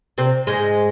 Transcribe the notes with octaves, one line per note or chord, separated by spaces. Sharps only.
C3 C4
G#2 G#3